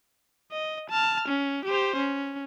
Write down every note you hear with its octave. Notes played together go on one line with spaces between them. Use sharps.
D#5
A5 F6
C#4
G4 C5
C#4